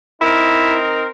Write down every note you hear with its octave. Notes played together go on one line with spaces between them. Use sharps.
C4 D#4 E4 A#4